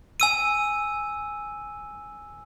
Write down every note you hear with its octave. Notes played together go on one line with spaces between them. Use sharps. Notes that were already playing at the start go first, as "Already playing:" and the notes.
G#5 E6 D#7